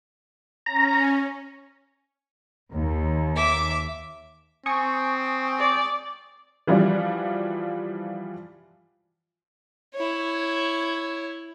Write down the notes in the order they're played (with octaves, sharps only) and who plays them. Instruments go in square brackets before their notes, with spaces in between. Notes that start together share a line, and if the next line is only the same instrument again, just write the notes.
[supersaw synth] C#4 [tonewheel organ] A#5
[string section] D#2
[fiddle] E5 D6
[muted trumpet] C4 [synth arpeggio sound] G#5 C#6 D#6
[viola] D5
[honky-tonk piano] E3 F3 G3 F4 F#4 D5
[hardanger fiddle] E4 C#5